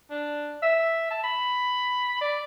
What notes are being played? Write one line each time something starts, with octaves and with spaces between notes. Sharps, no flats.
D4
E5
A5
B5
D5